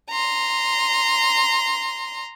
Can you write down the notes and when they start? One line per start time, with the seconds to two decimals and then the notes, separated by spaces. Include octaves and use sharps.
0.11 A#5 C6